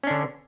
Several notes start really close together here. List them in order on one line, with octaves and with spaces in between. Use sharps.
C#4 D4 D3